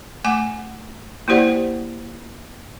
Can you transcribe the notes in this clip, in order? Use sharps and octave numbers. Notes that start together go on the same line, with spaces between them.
A3 F#5 G#5 D6
A#3 E4 G4 C5 D5 F#5